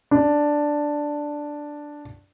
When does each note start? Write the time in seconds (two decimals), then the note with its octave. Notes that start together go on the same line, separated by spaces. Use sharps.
0.11 D4